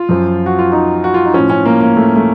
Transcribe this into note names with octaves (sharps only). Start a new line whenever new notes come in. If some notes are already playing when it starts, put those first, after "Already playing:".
Already playing: F4
F#2 F3
F#4
F4
D#4
F#4
F4
D#4
A2 F3 C#4
C#4
A#3
A#3
A3
A3